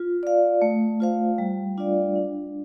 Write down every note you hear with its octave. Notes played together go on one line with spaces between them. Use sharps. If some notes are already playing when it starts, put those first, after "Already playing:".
Already playing: F4
D5 F5
A3
F4 C5 F5
G3
D4 F4 D5 F5
D4